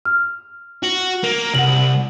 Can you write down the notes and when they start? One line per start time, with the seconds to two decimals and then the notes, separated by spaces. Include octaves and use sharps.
0.05 F6
0.83 F#4
1.24 A#3
1.55 C2 F#5 F#7